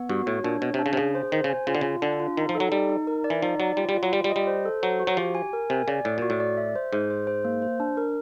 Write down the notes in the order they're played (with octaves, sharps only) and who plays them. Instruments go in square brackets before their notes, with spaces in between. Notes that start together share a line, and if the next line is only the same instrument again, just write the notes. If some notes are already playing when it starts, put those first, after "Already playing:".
Already playing: [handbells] B3
[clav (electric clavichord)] G2 [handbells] F#4
[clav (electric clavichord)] A2 [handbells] C#5
[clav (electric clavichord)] A#2 [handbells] D4
[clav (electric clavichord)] B2 [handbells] C#5
[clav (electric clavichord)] C3
[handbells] D4
[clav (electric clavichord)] C#3
C3
[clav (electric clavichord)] C#3 [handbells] G#4
[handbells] C5
[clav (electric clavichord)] D#3 [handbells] C5
[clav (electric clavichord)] C#3
[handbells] G#5
[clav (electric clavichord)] C#3 [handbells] F4
[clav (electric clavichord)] D3
[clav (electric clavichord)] C#3 [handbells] F4
[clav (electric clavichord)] D3 [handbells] D4
[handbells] F4
[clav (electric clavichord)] D#3 [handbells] D#4
[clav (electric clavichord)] F3
[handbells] A4
[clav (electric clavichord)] F#3
[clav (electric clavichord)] G3 [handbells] D#4
[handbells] D#4
A#4
D5
[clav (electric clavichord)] E3
[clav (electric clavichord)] F3 [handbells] D#4
[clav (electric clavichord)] F#3 [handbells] D5
[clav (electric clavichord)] G3 [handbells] F4
[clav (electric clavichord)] G3
[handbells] F4
[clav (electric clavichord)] F#3
[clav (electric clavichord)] G3 [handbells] F4
[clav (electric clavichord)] G3
[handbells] D#5
[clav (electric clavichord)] G3
[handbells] C5
A4
[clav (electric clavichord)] F#3 [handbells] C5
[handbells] F#4
[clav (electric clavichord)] F#3
[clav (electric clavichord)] F3 [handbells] G4
[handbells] G#5
A#4
[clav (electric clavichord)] C3 [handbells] G#5
[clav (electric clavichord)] C#3 [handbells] D5
[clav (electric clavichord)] A2 [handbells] D5
[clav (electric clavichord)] A#2 [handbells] F#4
[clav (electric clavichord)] A2
[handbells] D5
E5
C5
[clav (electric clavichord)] G#2 [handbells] C5
[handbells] C5
C5
A#3
C5
D4
A#4